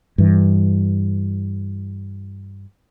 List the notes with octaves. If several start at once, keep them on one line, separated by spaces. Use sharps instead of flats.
G2 E3